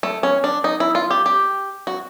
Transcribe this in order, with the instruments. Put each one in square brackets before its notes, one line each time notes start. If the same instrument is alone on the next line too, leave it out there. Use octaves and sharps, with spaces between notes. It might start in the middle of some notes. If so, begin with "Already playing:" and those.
[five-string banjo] A3
C#4
D4
D#4
E4
F4
G4
G4
F#4